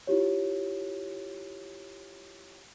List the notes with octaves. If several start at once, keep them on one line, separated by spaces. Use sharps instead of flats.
E4 F4 G4 C#5